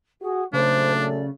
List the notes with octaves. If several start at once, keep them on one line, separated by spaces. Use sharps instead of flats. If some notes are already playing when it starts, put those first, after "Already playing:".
F#4 G#4
A#2 C#3 F#3 A3 D4 C5
D5